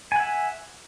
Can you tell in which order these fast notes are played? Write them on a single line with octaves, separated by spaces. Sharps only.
G#5 F#5 E5